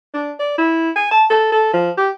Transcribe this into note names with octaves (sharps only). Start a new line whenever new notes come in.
D4
D5
E4
G#5
A5
A4
A4
F3
G4